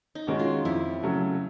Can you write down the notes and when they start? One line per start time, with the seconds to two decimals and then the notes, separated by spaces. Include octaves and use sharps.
0.15 D#4
0.27 D#3 G#3 C#4 F#4
0.39 F4
0.65 F2 E4
1.03 C#3 F#3 A3